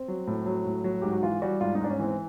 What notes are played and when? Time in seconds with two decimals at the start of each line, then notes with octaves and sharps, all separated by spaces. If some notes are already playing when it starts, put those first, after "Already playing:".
Already playing: C4
0.08 F#3
0.27 A2
0.46 F#3
0.66 A2
0.84 F#3
1.02 G#2 G4
1.13 F#4
1.22 E3 F4
1.42 G3 F#4
1.61 G#2 F4
1.75 D#4
1.81 G#2 D4
1.89 C#4
1.99 E3 C4